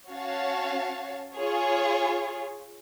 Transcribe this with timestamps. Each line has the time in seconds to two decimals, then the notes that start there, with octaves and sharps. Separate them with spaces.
0.10 C#4 F#4 C#5 F5 A5
1.37 F4 G#4 C#5